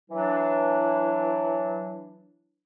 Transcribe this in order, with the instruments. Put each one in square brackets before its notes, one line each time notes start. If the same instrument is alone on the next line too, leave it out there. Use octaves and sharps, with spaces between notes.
[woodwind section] E3 F#3 D4